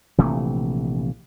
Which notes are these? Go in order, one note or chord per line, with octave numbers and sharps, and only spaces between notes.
A#1 C3 E3 A3